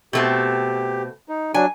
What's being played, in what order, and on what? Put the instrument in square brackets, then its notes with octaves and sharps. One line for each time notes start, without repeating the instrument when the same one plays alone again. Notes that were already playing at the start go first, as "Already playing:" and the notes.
[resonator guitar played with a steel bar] B2 A3 C4 [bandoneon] G4
[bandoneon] D#4
[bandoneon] F#3 D4 [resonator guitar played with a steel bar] G#5